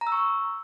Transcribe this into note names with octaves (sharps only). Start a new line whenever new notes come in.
A#5
E6
C#6
E6